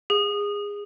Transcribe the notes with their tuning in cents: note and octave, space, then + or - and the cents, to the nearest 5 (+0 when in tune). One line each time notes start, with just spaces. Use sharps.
G#4 -20